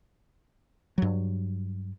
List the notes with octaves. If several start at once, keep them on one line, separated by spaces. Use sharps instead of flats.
G2 F#3